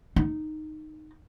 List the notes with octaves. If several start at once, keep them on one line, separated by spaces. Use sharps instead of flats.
D#4